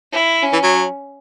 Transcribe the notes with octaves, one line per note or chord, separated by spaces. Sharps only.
E4
C#4
E3
F#3